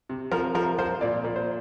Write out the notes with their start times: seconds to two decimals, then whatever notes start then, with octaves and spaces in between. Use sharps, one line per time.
0.09 C3
0.32 F3 A#4
0.55 F3 A#4
0.79 F3 C5
1.01 A#2 D5
1.24 A#2
1.36 C5